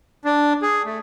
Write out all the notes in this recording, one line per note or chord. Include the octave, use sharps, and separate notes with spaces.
D4
G#4
A3